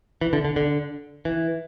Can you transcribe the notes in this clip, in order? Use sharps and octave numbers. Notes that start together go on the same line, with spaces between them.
E3
D3
D3
D3
E3